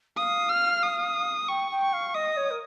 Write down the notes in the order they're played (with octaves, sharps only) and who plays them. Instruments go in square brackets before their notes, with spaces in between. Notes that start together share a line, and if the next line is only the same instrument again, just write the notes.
[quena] F5 [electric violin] D#6
[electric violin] F6
D#6
[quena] G5 [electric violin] C#6
[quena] G5
[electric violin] C#6
[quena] F5
[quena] D#5 [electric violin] D#6
[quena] C#5
A#4